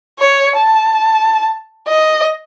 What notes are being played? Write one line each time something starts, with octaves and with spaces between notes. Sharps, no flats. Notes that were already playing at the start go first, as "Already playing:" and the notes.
C#5
A5
D#5